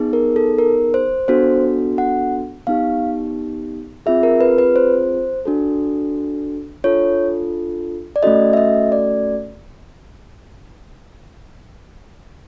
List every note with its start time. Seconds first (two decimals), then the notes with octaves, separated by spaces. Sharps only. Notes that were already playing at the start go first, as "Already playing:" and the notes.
Already playing: B3 D#4 G#4
0.13 A#4
0.36 A4
0.58 A#4
0.94 C5
1.28 B3 D4 F#4 A4 C5
1.98 F#5
2.67 B3 D#4 G4 F5
4.06 C4 F4 G#4 E5
4.23 A#4
4.41 B4
4.58 B4
4.76 C5
5.45 D4 F#4 A4
6.84 D4 F4 A4 C#5
8.16 D5
8.23 A3 C#4 F#4 A4 D#5
8.53 E5
8.57 D#5
8.92 D5